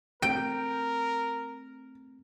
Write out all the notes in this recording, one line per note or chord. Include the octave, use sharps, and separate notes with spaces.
A3 C4 A#4 G5 D7